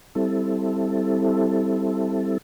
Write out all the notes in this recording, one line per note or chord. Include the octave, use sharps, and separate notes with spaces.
G3 C4 E4 A4